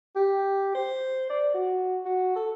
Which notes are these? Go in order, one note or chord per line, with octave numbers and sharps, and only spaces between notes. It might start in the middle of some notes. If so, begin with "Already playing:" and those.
G4
C5
D5
F#4
F#4
A4